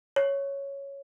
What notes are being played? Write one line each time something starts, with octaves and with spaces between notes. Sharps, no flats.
C#5